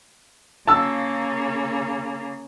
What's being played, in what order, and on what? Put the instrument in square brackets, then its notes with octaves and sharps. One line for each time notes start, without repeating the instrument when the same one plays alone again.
[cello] C#3 A#3 [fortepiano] A5 E6